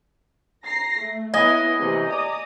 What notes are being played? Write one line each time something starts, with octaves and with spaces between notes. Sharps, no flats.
A#5 A#6 C7
A3
B3 E4 D#5 G#5
C3 E3 A#3
D5 A#5 D#6